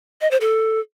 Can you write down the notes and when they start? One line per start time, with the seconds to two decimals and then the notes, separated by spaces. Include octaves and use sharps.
0.21 D#5
0.31 C5
0.41 A4